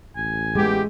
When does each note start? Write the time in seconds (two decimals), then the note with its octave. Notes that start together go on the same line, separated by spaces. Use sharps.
0.16 A1 G#5
0.55 G#3 A3 B3 G4